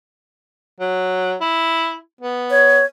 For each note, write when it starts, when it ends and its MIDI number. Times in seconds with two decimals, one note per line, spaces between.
0.80 1.35 54
1.41 1.96 64
2.21 2.81 59
2.50 2.85 73